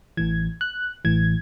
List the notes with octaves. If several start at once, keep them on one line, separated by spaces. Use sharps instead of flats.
A1 A2 E3 G#6
F#6
A1 A2 E3 G#6